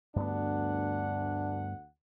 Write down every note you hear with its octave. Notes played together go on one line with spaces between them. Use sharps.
D2 G2 B3 D4 F#5